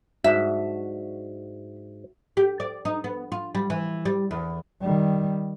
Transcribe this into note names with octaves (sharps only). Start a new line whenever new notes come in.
G#2 D4 F#4 E5
G4
D5
D#4
B3
F4
G3
E3
G3
E2
D#3 G3